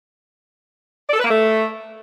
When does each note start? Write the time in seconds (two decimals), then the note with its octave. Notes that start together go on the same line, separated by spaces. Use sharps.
1.08 D5
1.14 A4
1.19 B4
1.25 A#3
1.30 A3